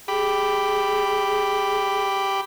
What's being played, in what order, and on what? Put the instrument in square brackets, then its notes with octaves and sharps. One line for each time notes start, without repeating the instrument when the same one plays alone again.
[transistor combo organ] G4 B5 [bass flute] G#4